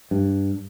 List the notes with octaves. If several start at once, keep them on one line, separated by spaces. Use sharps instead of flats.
G2